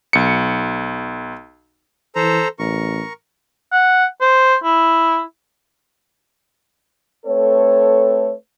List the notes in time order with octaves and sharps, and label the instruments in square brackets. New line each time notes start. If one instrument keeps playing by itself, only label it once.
[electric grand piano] B1 C#7
[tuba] E3 [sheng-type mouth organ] A4 C5 A#5
[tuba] A1 [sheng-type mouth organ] A#4 C#6
[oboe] F#5
C5
E4
[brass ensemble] A3 C4 A4 B4 C#5